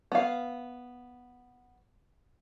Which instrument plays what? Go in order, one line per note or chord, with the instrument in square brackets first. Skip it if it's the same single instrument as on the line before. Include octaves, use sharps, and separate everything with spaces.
[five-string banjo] B3 F5